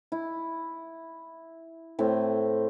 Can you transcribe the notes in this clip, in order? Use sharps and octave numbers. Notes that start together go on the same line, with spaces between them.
E4
A2 C4